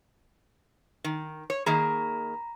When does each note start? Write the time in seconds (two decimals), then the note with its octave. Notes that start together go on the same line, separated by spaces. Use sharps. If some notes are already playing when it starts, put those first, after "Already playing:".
1.04 D#3
1.50 C#5
1.66 D#3 A#3 G#4 A#5 B5 A#6